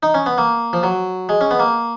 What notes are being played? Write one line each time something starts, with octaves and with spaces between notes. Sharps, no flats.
D#4
C#4
B3
A#3
F3
F#3
G#3
C#4
B3
A#3